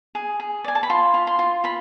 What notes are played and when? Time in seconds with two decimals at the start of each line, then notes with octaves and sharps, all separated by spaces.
0.15 G#4
0.40 G#4
0.64 D5 G#5
0.75 A5
0.83 B5
0.90 F4 C6
1.14 F4
1.27 C6
1.39 F4
1.64 F4 B5